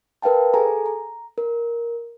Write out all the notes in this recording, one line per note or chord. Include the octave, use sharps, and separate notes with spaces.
A#4 B4 F5 G5 A5
G#4 A4 G#5 A#5
A#5
A#4